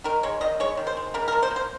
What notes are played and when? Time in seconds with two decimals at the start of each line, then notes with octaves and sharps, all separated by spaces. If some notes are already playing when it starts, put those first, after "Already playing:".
0.04 D#3 A#4
0.23 G#3 C#5
0.41 D#3 D#5
0.60 G#3 C#5
0.77 D#3
0.87 C5
0.97 G#3
1.14 C#3 A#4
1.28 A#4
1.32 F3
1.43 C5
1.51 A#3
1.56 C5